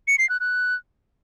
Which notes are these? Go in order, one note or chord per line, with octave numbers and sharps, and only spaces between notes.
C#7
C7
F#6
F#6